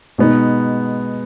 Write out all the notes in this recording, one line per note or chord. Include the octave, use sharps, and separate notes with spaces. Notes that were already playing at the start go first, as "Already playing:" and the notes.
B2 G#3 B3 D#4